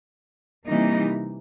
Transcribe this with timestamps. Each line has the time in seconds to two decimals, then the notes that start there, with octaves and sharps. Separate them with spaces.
0.67 C3 E3 G3 A#3 D#4